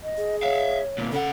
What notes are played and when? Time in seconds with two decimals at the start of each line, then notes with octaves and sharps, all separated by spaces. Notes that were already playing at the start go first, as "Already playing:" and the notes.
0.03 D#5
0.17 G#4
0.43 C#5 E5 F5
0.98 D2 A#2
1.12 C#3 A4 F#5